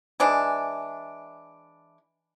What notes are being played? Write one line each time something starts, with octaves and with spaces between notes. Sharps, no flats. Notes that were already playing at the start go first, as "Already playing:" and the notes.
E3 G#3 D4